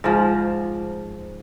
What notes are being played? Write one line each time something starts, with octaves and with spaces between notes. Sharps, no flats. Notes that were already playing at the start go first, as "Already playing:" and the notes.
G#2 F3